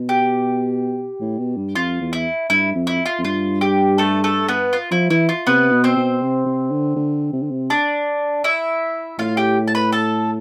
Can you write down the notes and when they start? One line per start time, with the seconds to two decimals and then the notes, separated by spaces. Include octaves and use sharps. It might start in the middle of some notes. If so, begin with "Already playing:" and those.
Already playing: B2
0.09 G4
1.20 A2
1.38 B2
1.57 G2
1.75 F2 F4
2.01 E2
2.13 E4
2.50 G2 E4
2.75 F2
2.87 E4
3.06 F4
3.19 F2
3.25 G2 F4
3.61 G4
3.98 A3 A4
4.24 A3 A4
4.48 B3 B4
4.73 F4
4.91 F3 E4
5.10 E3 E4
5.29 F4
5.47 C3 B3 B4
5.72 B2
5.84 C4 C5
5.97 B2
6.22 C3
6.46 C3
6.71 D3
6.96 D3
7.33 C3
7.42 D3
7.51 C3
7.70 D4 D5
8.44 E4 E5
9.19 A2 F4 F5
9.37 G4 G5
9.68 A5
9.75 B4 B5
9.92 A4 A5